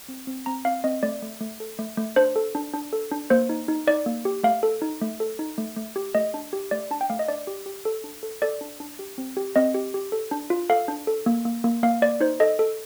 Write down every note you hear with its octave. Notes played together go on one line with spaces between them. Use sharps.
C4
C4
C4 A#5
C4 F5
C4 D#5
A3 D5
A3
A3
A4
A3
A3
D4 C5
A4
D4
D4
A4
D4
A#3 C5
D#4
D#4
D#4 D5
A#3
G4
A3 F5
A4
D#4
A3
A4
D#4
A3
A3
G4
A3 D#5
D4
G4
A3 D5
D4 A5
G5
A3 F5
D#5
D4 D5
G4
G4
A4
D4
A4
A4 D5
D4
D4
G4
C4
G4
C4 D#5
G4
G4
A4
D4
F4
A4 F5
D4
A4
A#3
A#3
A#3
A#3 F5
A#3 D5
D#4 C5
A4 D#5
A4